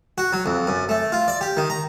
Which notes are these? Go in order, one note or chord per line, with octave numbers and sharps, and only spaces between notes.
F#4
F#3
F2
F#2
A3
F4
D5
G4
D#3
A#5